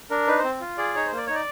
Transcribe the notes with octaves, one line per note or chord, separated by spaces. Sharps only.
D4 A#4
D#4 B4
C5
C4
F4
G#4 D5
D#4 C#5
C5
A#3
D5
D#4 C#5
D5